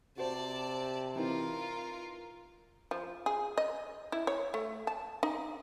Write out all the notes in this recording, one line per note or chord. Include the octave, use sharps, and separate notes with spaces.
C3 F#4 C5 D5 A5
E3 C4 D#4 F4 A#4
F3
G#4
D#5
E4
C#5
A3
A5
D#4